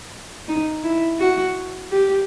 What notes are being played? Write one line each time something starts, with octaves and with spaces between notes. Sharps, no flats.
D#4
E4
F#4
G4